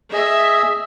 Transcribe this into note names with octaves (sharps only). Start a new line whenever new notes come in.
G#4 D#5 E5